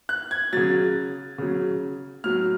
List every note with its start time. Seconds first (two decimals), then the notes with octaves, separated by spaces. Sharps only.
0.09 F#6
0.31 G#6
0.53 C#3 F#3 A6
1.38 C#3 F#3
2.24 A2 F#3 F6